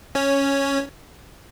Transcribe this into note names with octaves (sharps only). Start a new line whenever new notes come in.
C#4 C#5